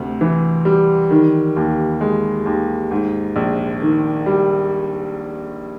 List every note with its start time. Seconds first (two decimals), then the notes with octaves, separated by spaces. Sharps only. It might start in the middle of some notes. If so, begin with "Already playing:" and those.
Already playing: D2 C3
0.21 E3
0.65 G3
1.11 D#3
1.56 D#2
2.01 G#3
2.46 D#2
2.91 G#2
3.36 A#1
3.82 D#3
4.26 G3